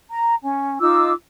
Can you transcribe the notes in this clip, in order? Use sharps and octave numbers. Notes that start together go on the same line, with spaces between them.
A#5
C#4
D#4 F4 D6 E6